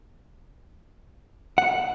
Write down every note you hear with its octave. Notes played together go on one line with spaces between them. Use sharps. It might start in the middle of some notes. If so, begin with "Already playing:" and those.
F#5